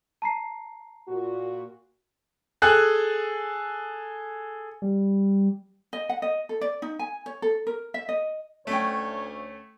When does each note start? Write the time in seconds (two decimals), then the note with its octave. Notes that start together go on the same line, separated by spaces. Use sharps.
0.22 A5 A#5 C7
1.07 A#2 F#4
2.62 G#4 A4 G#5 F#6
4.82 G3
5.93 D#5
6.09 F#5
6.22 D#5
6.49 A4
6.61 D5
6.82 D#4
6.99 G#5
7.26 C#5
7.42 A4
7.67 A#4
7.94 E5
8.09 D#5
8.67 D2 A3 C#4 C#5 G5